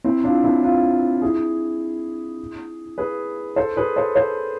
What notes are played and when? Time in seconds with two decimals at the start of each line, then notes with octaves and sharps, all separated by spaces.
0.04 C4 E4
0.24 D4 F4
0.44 C4 E4
0.63 D4 F4
1.22 E4 G#4
2.98 G#4 B4
3.56 A4 C5
3.77 G#4 B4
3.96 A4 C5
4.15 A4 C5